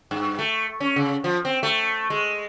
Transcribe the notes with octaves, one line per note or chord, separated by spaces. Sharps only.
G2
A3
C#4
C#3
F3
C4
A3
G#3